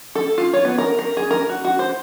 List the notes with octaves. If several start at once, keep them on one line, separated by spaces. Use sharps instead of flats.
A4
F4
C#5
B3
A#4
A#4
G#4
A#4
F#4
F#4
C5